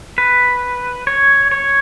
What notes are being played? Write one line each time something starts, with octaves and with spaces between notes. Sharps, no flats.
B4
C#5
C#5